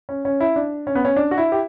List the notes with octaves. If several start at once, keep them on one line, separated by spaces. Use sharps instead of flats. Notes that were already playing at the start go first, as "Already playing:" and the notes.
C#4
C#4
E4
D4
C#4
B3
C#4
D4
F#4
E4
G4